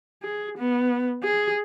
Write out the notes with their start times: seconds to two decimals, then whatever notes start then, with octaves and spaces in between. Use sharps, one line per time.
0.23 G#4
0.58 B3
1.23 G#4